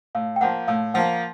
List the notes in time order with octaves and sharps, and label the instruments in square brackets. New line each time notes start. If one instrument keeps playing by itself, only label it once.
[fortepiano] A2 [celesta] F5
[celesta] G5
[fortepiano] F3 A#3 [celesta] F#5
[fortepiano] A2 [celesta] F5
[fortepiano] F3 A#3 [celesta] F#5